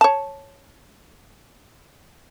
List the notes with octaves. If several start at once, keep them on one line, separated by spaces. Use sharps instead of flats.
C#5 A5